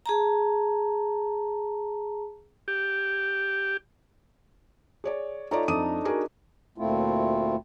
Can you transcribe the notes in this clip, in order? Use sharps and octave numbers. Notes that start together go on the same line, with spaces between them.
G#4 A5 A#5
G4
G#4 C#5 D5
A3 D#4 F4 C#5 D5 A#5
F2 D4 D#4 D#6 D#7
F#4 G#4 A#4
D2 A#2 A3 C4 E4 F4